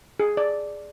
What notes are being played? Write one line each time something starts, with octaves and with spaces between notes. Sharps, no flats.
G#4
D5